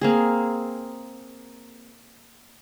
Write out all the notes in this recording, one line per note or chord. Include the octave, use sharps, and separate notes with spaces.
A#3 C4 G#4